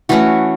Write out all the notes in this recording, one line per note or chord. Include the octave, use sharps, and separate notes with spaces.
E3 A3 C#4 F#4